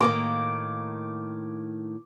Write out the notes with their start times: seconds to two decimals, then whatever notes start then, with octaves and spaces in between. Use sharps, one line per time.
0.01 A2 D#3 A#3 D6